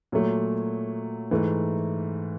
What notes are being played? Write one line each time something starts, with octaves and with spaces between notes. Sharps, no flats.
A#2 F#3 A3
G#2 E3 A3